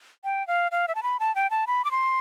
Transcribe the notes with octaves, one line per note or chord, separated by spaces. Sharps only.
G5
F5
F5
E5
A5
B5
A5
G5
A5
B5
D6
C6